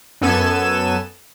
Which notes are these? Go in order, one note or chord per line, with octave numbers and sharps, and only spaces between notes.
F#2 B3 A4 G#5 E7